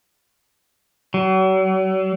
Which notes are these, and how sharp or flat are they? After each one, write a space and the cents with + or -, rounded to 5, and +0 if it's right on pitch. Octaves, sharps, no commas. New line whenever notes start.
F#3 +40